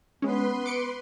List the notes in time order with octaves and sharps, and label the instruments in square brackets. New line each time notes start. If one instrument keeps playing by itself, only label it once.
[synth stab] G#3 C#4 [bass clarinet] B3 [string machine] B4 C6
[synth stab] D6 C#7 D7